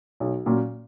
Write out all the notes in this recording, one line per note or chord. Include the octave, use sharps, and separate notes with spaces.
B1
A#2 F#3 C#4